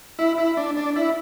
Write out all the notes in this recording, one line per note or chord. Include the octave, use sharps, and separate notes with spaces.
E4
E4
D4
D4
E4